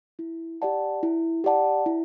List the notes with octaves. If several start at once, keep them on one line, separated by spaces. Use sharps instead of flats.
E4
G4 D5 F#5 A5
E4
G4 D5 F#5 A5
E4